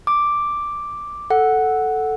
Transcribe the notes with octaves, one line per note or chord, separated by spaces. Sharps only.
D6
A4 F#5